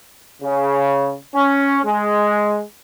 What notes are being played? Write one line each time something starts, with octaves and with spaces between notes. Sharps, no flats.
C#3
C#4
G#3